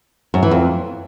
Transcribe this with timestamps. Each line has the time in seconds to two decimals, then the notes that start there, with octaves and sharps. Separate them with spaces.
0.34 F#2
0.43 E3
0.51 F2